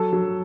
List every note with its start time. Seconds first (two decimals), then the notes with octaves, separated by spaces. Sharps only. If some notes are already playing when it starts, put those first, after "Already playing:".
Already playing: F#3 A4
0.13 F#3